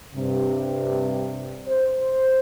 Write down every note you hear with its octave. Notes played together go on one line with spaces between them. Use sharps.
G2 C3
C5